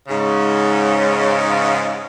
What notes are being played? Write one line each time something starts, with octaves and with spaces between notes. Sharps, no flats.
G#2 C#3